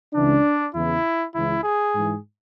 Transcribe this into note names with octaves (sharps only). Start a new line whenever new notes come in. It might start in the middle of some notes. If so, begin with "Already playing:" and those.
C#2 C#3 E3 D4
E2 C#3 E3 E4
C#2 C#3 E3 E4
G#4
G#2 E3